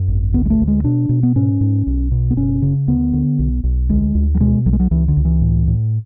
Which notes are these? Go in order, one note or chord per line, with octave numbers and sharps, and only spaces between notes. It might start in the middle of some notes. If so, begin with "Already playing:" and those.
Already playing: F#2
G#1
D2 B3
G#3
A3
D2
G#3
B2 D4
B2
B3
G#2 C#4
G#2
B1
B2
B3
F#1 C#4
C#3
D2 B3
D3
B1
B1
D2 G#3
D2
F#3
B2 G#3
B1 F#3
G#3
F#3
C#2 E3
D3
C#2
E3
A2
A2